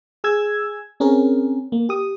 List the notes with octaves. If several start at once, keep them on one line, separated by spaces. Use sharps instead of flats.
G#4 E6 G#6
C4 C#4 G#4 A#4
A#3
G4 D#6